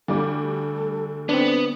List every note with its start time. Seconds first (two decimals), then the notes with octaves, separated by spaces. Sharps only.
0.08 D2 G3 A4 D6
1.29 B3 C4 D4